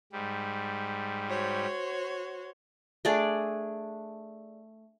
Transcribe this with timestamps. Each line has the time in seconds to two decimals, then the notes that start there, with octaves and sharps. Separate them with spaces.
0.12 G#2 G3
1.29 F#4 C5 C#5
3.05 A3 D4 G#4 D5